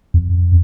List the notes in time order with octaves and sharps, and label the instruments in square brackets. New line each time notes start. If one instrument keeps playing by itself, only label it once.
[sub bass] F2